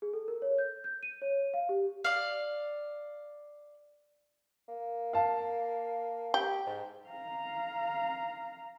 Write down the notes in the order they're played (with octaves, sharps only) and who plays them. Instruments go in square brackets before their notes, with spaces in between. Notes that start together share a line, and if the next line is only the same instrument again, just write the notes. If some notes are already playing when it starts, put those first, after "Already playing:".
[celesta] G#4
A4
A#4
C#5
G6
G6
D#7
C#5
F5
G4
[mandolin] D5 F5
[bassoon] A#3
[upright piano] F5 A5
[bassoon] G4 [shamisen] G5
[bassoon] G#2
[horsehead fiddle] F5 A#5